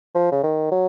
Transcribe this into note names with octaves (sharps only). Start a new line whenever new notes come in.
F3
C#3
D#3
F#3